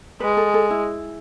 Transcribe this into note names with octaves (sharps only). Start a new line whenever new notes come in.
G#3 B4
A4
A4
E4